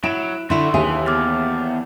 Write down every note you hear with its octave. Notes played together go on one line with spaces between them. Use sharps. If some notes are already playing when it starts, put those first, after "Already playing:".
F#3 E4 D7 E7
D3 A3 E4 F#4 C6
D#2 E3 G#4 E5
E2 D6 F6 A6